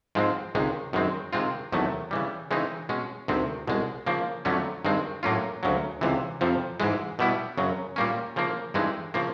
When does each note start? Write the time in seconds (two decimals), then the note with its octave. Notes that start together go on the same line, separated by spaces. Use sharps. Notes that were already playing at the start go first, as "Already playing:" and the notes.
0.15 G#2 F3 G#3 C4
0.55 C#2 C3 D#3 G#3
0.93 F#2 D#3 G#3 C4
1.33 C3 D#3 G#3 C4 F4
1.72 E2 C3 D#3 F#3 A3
2.11 C#3 E3 G3
2.51 C#3 E3 G#3 C4 D#4
2.89 B2 G#3 C#4
3.28 D2 C3 D#3 G#3 C4
3.67 C2 B2 G#3
4.06 C#3 F3 A#3
4.45 F2 D3 F#3 A3 C#4
4.85 G2 D#3 G#3 C4
5.23 A2 F#3 A#3 C#4 F4
5.63 D2 C#3 F#3
6.01 C#2 C3 E3
6.41 F2 C3 F3
6.80 G#2 E3 G#3
7.19 B2 G3 B3 E4
7.58 F#2 C#3 F#3
7.96 A#2 G3 A#3 C#4
8.36 C#3 F3 A#3
8.74 G2 E3 G#3 C4 D#4
9.14 C#3 F3 A#3